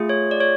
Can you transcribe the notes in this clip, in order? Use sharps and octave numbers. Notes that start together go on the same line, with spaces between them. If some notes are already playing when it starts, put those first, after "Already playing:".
Already playing: A3 F4 G#4
C#5
D5
C#5